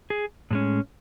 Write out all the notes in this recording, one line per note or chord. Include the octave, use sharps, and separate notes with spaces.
G#4
A2 G#3 C#4